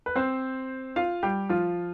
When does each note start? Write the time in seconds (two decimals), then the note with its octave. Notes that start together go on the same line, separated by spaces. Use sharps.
0.06 B4
0.16 C4 C5
0.96 F4 F5
1.23 G3 G4
1.49 F3 F4